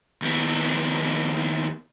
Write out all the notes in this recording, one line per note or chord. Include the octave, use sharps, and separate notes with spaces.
D#2 B3